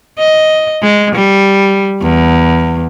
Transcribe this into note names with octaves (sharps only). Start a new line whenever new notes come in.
D#5
G#3
G3
E2